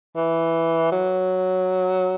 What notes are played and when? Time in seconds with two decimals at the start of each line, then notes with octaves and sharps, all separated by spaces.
0.16 E3
0.92 F#3